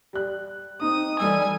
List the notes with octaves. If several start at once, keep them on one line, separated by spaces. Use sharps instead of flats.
G3 F#6
C4 D#4 D#6
E3 G3 A3 G#5 E6